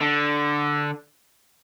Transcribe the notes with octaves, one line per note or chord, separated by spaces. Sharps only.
D3